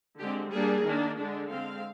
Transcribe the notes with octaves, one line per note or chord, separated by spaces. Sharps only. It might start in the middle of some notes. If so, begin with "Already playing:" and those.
D3 G#3 C4 G4
G3 A#3 D4 G#4
D#3 A#3 D4
D3 G#3 D4
D3 G#3 C4 F5